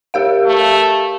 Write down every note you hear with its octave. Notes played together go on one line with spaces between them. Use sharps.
G4 A#4 F5
A3